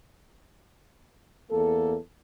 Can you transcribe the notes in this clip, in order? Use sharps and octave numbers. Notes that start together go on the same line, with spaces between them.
E2 A#3 A4